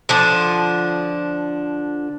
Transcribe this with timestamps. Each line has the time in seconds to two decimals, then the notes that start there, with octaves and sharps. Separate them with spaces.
0.09 D3 F3 D4